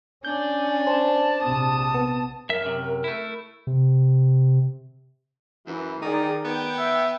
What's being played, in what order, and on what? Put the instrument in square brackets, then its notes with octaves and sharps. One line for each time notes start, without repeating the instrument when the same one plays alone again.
[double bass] C#4 [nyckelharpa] D4 D5 [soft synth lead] G6
[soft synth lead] C5 [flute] A5
[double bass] A#1 C3 [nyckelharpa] D#6
[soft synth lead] B3
[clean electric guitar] F#2 E5 [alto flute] A#4
[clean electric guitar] F#2 C3
[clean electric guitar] A3 E4 [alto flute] A#4
[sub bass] C3
[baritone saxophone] F#2 [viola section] E3
[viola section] D#3 G#4 D5 [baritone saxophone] D#4
[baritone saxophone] B3 [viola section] G5
[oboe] E5